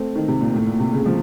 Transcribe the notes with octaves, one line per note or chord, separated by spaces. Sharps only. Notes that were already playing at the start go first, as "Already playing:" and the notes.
Already playing: A3 C4
D#3
C3
A#2
A2
A#2
C3
C#3
F3